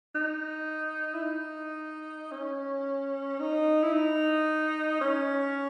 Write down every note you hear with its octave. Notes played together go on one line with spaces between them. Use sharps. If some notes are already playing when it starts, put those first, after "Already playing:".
D#4
E4
D#4
C#4
D#4
E4
D#4
C#4